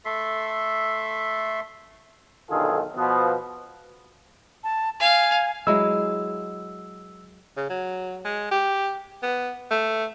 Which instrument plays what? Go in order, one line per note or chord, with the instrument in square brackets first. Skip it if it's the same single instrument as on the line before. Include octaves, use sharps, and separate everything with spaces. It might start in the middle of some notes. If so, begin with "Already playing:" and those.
[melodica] A3 A4 E5 C6
[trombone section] B1 D3 D#3 F4 G#4 A4
B2 F3 B3
[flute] A5
[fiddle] F5 [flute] G#5
[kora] F#3 G#3 E4 [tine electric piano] E6
[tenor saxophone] C#3
F#3
G#3
G4
B3
A3